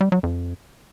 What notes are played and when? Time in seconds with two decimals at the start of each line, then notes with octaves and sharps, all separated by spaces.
0.01 G3
0.12 F#3
0.23 F2